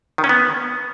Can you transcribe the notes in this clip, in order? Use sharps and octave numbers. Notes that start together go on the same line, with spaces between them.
D#3
C#4
B3